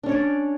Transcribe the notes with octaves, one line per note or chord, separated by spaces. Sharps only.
C#4 D4 C#5 D5